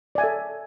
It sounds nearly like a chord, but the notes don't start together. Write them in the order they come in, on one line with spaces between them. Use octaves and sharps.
D5 G#5 E5 A4